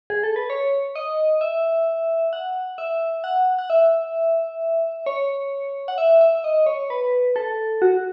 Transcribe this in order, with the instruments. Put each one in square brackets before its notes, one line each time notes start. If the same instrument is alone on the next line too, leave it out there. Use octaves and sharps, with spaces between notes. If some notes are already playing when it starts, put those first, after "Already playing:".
[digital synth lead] G#4
A4
B4
C#5
D#5
E5
F#5
E5
F#5
F#5
E5
C#5
F#5
E5
E5
E5
D#5
C#5
B4
A4
F#4